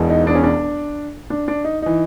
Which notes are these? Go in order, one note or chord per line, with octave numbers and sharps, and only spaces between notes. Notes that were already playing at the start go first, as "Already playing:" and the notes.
Already playing: E1 E2 B2
D#4
D4
C#4
D4
D4
D4
D#4
E3 D#4